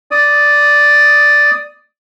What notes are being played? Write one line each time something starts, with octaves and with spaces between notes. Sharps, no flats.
D5 D#6